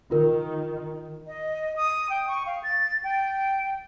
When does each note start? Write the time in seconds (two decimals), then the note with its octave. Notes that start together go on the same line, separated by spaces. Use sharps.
0.11 D#3 F4 A#4
1.27 D#5
1.76 D#6
2.10 G5
2.28 C#6
2.46 F5
2.63 A6
3.04 G5